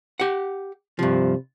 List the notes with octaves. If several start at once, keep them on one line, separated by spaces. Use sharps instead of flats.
G4 F#5
G2 C3 F3